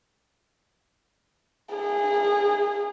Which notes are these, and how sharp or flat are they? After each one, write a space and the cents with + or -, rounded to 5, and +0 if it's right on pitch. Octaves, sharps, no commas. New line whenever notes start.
G#4 -25